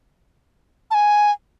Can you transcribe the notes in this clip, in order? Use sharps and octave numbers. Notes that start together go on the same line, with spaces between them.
A5
G#5